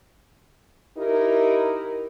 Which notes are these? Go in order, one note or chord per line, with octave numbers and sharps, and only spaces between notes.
D#4 E4 G4 A#4